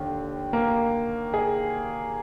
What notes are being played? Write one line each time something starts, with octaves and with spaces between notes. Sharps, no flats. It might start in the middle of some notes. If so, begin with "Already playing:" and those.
Already playing: D#2 D3
A#3
G#4